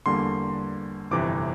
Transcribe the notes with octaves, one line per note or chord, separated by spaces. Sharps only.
E2 D3 G3 A#3 C6
G1 F2 C3 E3 D6